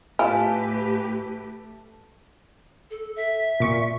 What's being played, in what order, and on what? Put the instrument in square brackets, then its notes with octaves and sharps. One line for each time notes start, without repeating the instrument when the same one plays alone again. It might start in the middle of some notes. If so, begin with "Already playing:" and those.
[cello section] A2 G4 B4 [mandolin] A3 A4 [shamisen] F4 [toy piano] G#5
[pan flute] A4
E5
[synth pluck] A#2 C#6